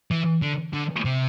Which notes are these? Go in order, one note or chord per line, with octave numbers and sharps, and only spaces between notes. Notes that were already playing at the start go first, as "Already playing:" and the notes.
E3
D3
D3
C3